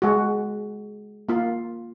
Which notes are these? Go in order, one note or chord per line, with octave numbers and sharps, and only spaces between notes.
G#3 F#4
A#3 F4